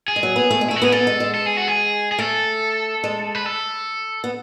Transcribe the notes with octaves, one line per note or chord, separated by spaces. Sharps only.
G#4
G#3
F#3
B3
A3
G#3
A3 E4
F#4
B3
G#4
B3 A4
G#3
G#3
A4
G#4
F#4
G#4
G#4
A3 A4
G#3
B4
A4
B3